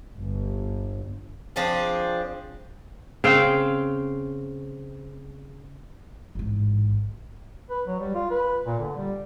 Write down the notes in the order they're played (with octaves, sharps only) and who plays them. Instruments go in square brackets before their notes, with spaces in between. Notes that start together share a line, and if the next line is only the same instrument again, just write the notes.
[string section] G1
[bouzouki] F3 C4 D4 G#4
[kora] C#3 C4 F5 G5
[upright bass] A1 G#2
[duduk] B4
F#3
G3
F4
B4
A#2
D3
G3